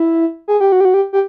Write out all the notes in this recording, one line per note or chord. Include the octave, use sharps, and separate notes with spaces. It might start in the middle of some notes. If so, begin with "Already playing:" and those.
Already playing: E4
G#4
G4
F#4
G4
F#4
G4
G4